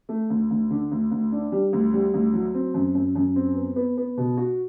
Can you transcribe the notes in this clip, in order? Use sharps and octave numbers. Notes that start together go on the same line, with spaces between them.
A3
D2
D2
D3
D2
D2
D4
G3
D2
G3
D2
F#3
C4
F#2
F#2
F#2
C4
B3
B3
B3
B2
F#4